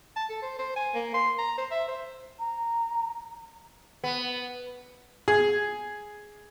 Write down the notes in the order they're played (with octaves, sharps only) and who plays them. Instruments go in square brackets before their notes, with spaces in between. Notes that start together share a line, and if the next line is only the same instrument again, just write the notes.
[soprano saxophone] A5
A4
C5
C5
G#5
A#3
C6
A#5
C5
E5
C5
[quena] A#5
[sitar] B3
[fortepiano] G#4